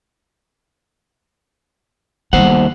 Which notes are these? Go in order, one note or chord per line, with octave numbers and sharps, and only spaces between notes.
D#2 G3 B3 C5 F#5